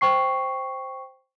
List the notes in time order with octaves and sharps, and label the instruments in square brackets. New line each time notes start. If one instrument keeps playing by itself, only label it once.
[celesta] C5 G5 C#6 C7